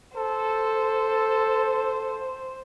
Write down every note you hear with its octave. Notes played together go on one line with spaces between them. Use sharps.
A4 C5